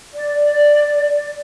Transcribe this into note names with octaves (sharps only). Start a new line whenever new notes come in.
D5